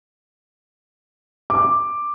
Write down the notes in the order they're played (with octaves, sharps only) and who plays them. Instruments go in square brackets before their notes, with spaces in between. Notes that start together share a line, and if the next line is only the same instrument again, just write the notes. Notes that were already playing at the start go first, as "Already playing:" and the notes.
[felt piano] D6